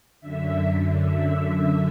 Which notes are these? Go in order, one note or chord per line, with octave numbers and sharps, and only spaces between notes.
F#2 D3 E5
F#2 D3
F#2 D3 E5